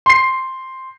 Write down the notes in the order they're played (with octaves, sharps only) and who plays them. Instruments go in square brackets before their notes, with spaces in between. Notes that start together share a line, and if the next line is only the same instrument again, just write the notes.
[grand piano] C6 C7